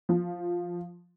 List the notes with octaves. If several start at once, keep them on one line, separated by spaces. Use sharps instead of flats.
F3